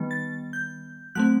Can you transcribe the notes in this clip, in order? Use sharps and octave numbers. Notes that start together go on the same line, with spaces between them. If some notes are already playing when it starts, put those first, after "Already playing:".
Already playing: D#3 G3 B3
A6
G6
F#3 A3 C4 F#6